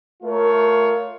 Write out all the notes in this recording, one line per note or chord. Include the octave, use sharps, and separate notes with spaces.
A3 F4 A#4 C#5